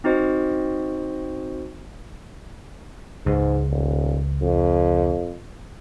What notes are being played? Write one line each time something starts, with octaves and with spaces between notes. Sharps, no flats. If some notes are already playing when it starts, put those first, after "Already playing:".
C4 D#4 F#4 C5 D#5
C#2 G#2
D#1
F2